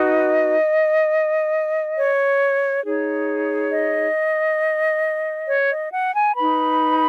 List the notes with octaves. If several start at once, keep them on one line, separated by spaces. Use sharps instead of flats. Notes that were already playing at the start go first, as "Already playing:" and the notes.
Already playing: D#4 F#4 B4 D#5
C#5
D#4 G#4 C#5
D#5
C#5
D#5
F#5
G#5
D#4 B4 B5